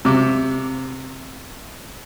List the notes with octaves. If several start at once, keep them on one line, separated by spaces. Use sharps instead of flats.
C3 D6